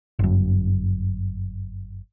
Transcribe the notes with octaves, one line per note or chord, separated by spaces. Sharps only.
G1 F#2